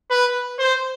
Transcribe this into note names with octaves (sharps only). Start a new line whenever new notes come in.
B4
C5